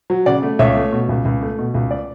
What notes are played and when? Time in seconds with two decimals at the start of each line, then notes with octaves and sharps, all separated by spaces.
0.10 F#3
0.26 C#3 D5 F#5
0.43 A3
0.59 C#2 C#5 E5
0.76 A3
0.92 B2
1.09 C#2
1.25 C#2
1.42 A3
1.58 B2
1.74 C#2
1.91 D5